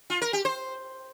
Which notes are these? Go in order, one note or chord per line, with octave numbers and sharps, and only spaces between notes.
F4
A#4
G4
C5